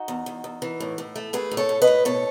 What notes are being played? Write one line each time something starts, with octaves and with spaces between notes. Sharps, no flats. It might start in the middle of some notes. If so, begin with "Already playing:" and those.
Already playing: D#4 F#4
E2
E2
E2
E3
A2
A2
A3
A3 G#4 B4
A2
A4 C#5
A2
B4 D#5
A2
B2 A4 C#5